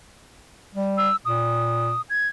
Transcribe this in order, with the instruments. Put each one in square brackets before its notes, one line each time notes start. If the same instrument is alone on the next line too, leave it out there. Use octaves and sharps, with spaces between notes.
[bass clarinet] G3
[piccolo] E6
[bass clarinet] A#2 [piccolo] D#6
[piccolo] G#6